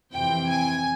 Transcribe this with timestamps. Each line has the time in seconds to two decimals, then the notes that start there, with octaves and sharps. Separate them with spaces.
0.12 F2 C3 E3 G5
0.48 G#5